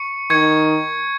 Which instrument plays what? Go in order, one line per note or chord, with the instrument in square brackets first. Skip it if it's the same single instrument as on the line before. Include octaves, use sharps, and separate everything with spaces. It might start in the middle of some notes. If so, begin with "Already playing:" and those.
Already playing: [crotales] C#6 C#7
[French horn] D#3 [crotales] C#6 G#6 C#7